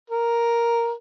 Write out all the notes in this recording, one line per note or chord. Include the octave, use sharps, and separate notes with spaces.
A#4